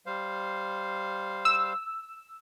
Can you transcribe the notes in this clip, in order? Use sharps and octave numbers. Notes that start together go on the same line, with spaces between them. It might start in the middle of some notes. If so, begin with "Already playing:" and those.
G3 C5 F5
E6